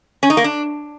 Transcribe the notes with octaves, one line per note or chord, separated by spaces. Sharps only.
C#4
D#4
A#3
D4